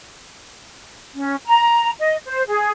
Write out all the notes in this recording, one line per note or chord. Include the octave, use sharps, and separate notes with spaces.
C#4
A#5
D#5
C5
G#4